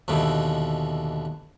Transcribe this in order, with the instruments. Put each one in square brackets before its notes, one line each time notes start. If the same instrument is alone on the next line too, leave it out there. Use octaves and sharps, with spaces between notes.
[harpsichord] D#2 B2 D3 E3